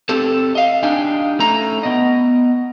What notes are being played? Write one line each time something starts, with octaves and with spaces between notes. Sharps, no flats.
C4 G4 A4
D#5 F5
D4 D#4 G4 G#5
A3 C#4 A#5
B3 D#5